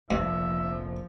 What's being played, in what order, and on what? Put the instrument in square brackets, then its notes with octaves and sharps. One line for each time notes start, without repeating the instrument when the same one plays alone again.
[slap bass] F1 A#1 C3 [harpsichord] G2 [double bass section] F3 [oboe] E5